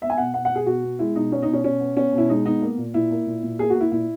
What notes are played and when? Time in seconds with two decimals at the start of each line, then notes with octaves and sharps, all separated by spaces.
0.01 B3 E5
0.10 G#5
0.18 B2 F#5
0.34 B3 F#5
0.45 F#5
0.51 B2 G#4
0.66 B2 F#4
0.83 B3
0.99 G#3 E4
1.15 B2 D#4
1.32 B3 C#4
1.42 D#4
1.47 B2
1.53 C#4
1.64 B2 C#4
1.80 B3
1.96 B3 C#4
2.13 B2 E4
2.29 G#3 D#4
2.45 B3 D#4
2.62 A#3
2.78 A#2
2.94 A#2 E4
3.11 A#3
3.26 A#2
3.43 A#2
3.59 A#3 G#4
3.70 F#4
3.75 A#3
3.81 E4
3.92 A#2 E4